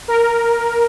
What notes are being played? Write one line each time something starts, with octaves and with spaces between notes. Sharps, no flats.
A#4